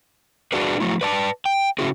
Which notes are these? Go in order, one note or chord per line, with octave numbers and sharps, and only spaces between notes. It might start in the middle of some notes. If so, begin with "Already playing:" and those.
D4 F#4 G#4 B4
F3 F#3 A3 E4
B4 D5 A5
G5
A2 C#3 C#4 E4 F#4 G#4